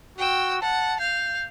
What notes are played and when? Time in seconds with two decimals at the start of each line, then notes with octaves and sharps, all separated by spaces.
0.18 F#4 G5 E6
0.62 F#5 A5
1.00 F5 G6